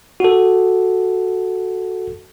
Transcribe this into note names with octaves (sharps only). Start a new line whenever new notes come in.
F#4 A4